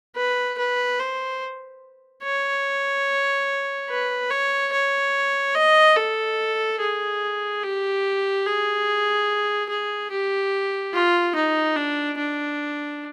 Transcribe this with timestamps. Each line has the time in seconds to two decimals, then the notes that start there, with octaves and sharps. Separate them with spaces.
0.16 B4
0.58 B4
1.00 C5
2.23 C#5
3.89 B4
4.31 C#5
4.72 C#5
5.55 D#5
5.96 A4
6.80 G#4
7.62 G4
8.45 G#4
9.69 G#4
10.11 G4
10.93 F4
11.35 D#4
11.76 D4
12.18 D4